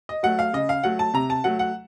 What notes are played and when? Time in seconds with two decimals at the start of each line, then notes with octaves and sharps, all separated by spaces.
0.09 D#5
0.23 F#3 A3 F#5
0.39 F5
0.53 C#3 D#5
0.69 F5
0.83 F#3 A3 F#5
0.99 A5
1.14 C3 A#5
1.30 A5
1.44 F#3 A3 F#5
1.59 F#5